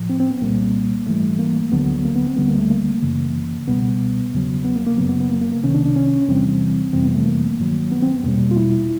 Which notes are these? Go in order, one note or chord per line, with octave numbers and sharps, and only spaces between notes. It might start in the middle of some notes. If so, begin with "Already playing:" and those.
Already playing: A2 F3
C4
C4
B3
C2 A#2 G3 A#3
G#2 E3 G3 A3
A#3
D2 D3 F#3 B3
A#3
B3
C4
D2 D3 G3 B3
A#3
A3
A#3
F#2 C#3 E3
C#2 B2 G3 B3
E2 C#3 F#3
B3
A#3
A#3
F#2 C#3 F#3 B3
B3
B3
A#3
A#3
A#3
C2 C3 D#3 C#4
D4
D4
C#4
E2 C3 E3 G3 C4
F2 C3 E3 G3 C4
B3
A3
A#3
G2 D#3 F#3
B3
C4
B3
E2 B2 G3 A#3
F4
E4